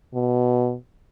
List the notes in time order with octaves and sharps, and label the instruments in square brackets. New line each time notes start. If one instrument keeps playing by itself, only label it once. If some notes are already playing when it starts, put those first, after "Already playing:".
[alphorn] B2